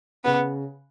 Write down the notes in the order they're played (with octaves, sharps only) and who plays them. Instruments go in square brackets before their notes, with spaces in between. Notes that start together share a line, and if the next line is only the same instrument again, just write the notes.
[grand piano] C#3 [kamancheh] B3